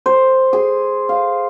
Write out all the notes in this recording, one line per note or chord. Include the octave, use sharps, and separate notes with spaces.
C5
G#4
F5